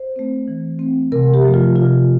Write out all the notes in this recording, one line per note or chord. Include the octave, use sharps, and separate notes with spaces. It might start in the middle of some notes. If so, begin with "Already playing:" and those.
Already playing: C5
A3 C4
E3
A3 C4
C3 A#4
G4
F3 A3
F4
C3 F4